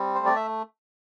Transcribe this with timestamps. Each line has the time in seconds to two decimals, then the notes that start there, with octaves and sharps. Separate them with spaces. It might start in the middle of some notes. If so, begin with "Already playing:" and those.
Already playing: G3 C4
0.15 A3 C5
0.26 D5
0.36 E5